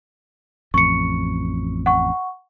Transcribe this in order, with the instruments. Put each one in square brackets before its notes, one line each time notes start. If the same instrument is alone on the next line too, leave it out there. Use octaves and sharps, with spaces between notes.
[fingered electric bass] A1 F2 [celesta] C#6 C#7
[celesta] F#5 C#6